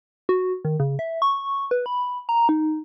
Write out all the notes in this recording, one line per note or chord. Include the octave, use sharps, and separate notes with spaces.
F#4
D#3
C#3
E5
C#6
B4
B5
A#5
D#4